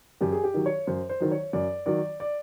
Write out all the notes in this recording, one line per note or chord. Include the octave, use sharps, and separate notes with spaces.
F#2 G4
G#4
G4
D#3 F#3
C#5
F#2 C5
C5
D#3 F#3
C#5
F#2 D5
D#3 F#3 D5
D5